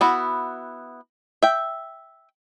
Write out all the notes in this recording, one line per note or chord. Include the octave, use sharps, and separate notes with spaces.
B3 E4 F#4
E5 G5